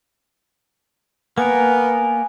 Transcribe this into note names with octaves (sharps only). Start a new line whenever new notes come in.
A#3 B3 A#4 G#5